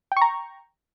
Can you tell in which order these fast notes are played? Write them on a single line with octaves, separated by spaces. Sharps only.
G5 C#6 A#5